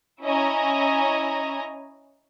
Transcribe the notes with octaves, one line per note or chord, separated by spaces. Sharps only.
C#4 E4 D#5 G#5 A#5